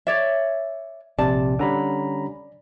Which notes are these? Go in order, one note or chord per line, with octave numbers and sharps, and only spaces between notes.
C#5 D5 E5
A#1 C3 D5 A5
D3 G3 C#4 A#5 B5